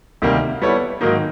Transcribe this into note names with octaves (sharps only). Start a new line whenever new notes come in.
D2 C3 D#3 G3 A#3
G3 B3 E4 A4 C#5
G#2 D#3 F#3 A#3 D#4